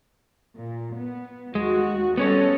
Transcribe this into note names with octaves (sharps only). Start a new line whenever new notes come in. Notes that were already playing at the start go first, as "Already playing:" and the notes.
A#2
B3
D#2 G#3 F#4
G3 B3 C#4 A4 C#5 D#5